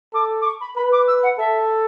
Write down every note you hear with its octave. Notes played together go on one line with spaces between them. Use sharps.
A4 D6
D6
C#6
B5
B4 B5
D6
E6
F#5
A4 E5